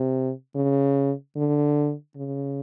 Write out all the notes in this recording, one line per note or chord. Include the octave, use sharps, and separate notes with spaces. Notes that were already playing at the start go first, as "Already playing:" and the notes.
Already playing: C3
C#3
D3
C#3